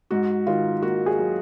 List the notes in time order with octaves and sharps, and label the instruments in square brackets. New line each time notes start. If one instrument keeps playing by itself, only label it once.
[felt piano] G#2 F#4
D#3 F4
A#3 F#4
G#4
F#3